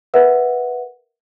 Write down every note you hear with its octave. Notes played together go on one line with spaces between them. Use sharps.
A#4 B4 E5 F#5